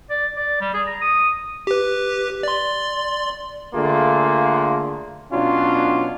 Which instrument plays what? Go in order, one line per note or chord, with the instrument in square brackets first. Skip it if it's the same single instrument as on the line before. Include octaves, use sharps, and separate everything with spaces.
[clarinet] D5
D5
G3
G#4
A#5
D#6
[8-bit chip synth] G4 B4
D5 C6
[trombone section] D3 A3 A#3 F4 G#4
B2 F#3 C#4 D4 F4